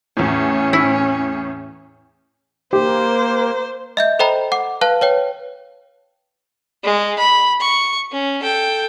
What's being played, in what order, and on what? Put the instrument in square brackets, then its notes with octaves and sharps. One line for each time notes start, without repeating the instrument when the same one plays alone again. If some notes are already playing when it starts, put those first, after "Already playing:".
[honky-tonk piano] E2 A2 [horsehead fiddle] C#4
[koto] E4
[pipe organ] A#3 [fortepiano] G4 [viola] C5
[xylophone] D#5 E5 G6
A4 C5 D#5 G5 A#5 B5
F#5 D6
B4 F5 A5 F#6
B4 C#5 G5
[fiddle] G#3
B5
C#6
C#4
A4 G5